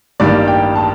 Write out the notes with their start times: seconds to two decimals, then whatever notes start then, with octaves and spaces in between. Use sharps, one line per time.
0.20 A1 G2 D#3 G3 A#3 D5
0.48 G5
0.75 A5